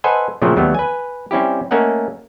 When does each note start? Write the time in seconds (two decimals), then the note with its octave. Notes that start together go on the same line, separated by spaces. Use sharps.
0.04 A4 B4 C5 D#5 F#5 G#5
0.42 A#2 C#3 F3 F#3 A3 C4
0.56 D#2 F#3 G3 A3 B3
0.75 B4 G#5
1.31 G3 C4 C#4 E4 G4
1.71 A3 A#3 C#4 A#4 D#5 F#5